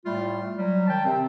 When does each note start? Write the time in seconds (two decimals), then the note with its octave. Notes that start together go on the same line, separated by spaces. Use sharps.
0.05 A2 G3 A3 F4
0.57 F#3 G3
0.88 D#3 G5 A5
1.04 C3 C4